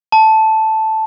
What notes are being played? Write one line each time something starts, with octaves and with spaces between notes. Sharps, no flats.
A5